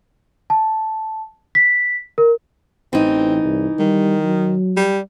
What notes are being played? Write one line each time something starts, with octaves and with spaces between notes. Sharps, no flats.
A5
B6
A#4
A1 E3 C4 D#4
C2
D#3 G3
F#3
G3